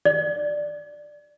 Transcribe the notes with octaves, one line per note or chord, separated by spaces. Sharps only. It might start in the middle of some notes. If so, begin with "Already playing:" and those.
D5